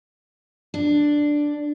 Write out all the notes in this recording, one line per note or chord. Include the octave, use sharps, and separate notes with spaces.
D4